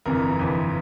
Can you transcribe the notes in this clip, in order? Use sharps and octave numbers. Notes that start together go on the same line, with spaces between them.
G1 F2 C3 E3 A#4
G1 F2 C3 E3